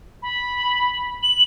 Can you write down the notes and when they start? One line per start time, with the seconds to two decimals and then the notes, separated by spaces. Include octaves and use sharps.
0.22 B5
1.23 F#7